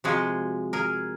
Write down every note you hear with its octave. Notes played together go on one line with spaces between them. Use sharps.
C3 F3 G#3 F#4 G#4
G#4 A#4